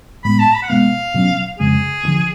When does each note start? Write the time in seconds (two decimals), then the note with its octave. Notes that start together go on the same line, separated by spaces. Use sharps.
0.24 A2 G#3 B3 B5
0.39 A5
0.54 B5
0.63 F#5
0.69 B2 G#3 B3 F5
1.14 B2 F#3 C#4
1.59 F2 C#3 G#3 G#4
2.03 D2 D3 F3